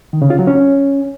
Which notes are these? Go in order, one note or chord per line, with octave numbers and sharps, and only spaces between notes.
D#3
C#3
F4
F#3
C#4